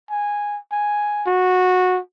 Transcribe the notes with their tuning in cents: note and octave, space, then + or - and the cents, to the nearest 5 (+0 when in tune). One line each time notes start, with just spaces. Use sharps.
G#5 -10
G#5 +0
F#4 -15